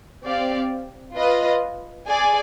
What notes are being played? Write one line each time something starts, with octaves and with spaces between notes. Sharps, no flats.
C4 G4 D5 F5
F4 B4 D#5
G#4 D5 G#5